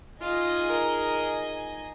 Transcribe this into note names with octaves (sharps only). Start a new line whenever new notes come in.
D#4 F4 G#4 D#5 G#5
A#4